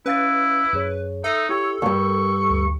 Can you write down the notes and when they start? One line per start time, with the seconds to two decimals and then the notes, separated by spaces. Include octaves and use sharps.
0.06 C#4 E4 B4 F5 A6
0.73 F#2 G#4 C#5
1.24 D#4 A4 E5
1.49 E4 G4 C#5 G5
1.82 E2 G2 A#4 C#6
2.50 D2